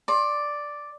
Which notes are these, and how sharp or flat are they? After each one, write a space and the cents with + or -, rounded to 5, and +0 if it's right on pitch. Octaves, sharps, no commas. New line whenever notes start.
D5 +0 C6 +30